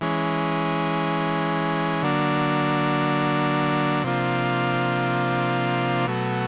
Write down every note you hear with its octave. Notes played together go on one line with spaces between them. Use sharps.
E3 G#3 C#4
D3 F#3 A#3 D4
C3 F3 A#3 D4 F4
B2 F#3 A3